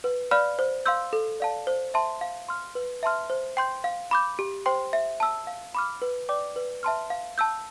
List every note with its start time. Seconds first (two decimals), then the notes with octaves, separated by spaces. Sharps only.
0.04 B4
0.31 D5 F5 B5 F6
0.59 C5
0.86 F5 C6 E6 G6
1.13 A4
1.40 D5 F5 A5
1.67 C5
1.94 E5 A5 C6
2.21 F5
2.49 C6 F6
2.75 B4
3.03 E5 A5 C6 F6
3.30 C5
3.57 G5 C6 G6
3.84 F5
4.11 B5 D6 G6
4.39 G4
4.66 C5 G5 C6
4.93 E5
5.20 A5 E6
5.47 F5
5.75 B5 D6 F6
6.02 B4
6.29 D5 G5 D6
6.56 B4
6.83 E5 A5 C6 F6
7.10 F5
7.38 A5 E6 G6